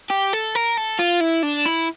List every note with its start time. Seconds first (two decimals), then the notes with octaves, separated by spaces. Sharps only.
0.10 G4
0.33 A4
0.55 A#4
0.77 A4
0.99 F4
1.20 E4
1.43 D4
1.65 E4